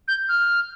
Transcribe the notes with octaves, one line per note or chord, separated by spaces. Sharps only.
G6
F6